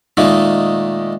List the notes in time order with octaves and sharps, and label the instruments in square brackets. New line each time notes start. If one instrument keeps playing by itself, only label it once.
[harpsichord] A#2 D#3 G#3 A3